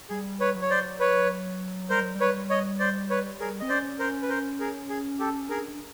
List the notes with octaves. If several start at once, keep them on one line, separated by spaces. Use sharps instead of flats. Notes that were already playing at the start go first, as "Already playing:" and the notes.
G3 G#4
B4 C#5
F#3
C#5
C5 D5
B4 C#5
G3 A#4 C5
F#3
G3
B4 C#5
C#5 D#5
C5 D5
B4 C#5
G#4 A#4
C4 D#5
C#4 C5 D5
A#4 C5
B4
A#4 C5
G#4 A#4
G#4
G4 A4
D4 G#4 A#4